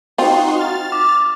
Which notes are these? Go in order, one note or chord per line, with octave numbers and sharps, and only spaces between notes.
C4 D#4 F4 F#4 C6
F6 A6
D6